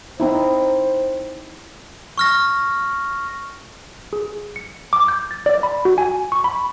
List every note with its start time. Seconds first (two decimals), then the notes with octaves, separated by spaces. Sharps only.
0.20 C4 D#4 E4 C5
2.18 C#6 F6 A#6
4.13 G#4
4.56 C#7
4.93 D6
5.08 G6
5.31 A6
5.46 D5
5.63 B5
5.85 F#4
5.98 G#5
6.32 C#6
6.44 B5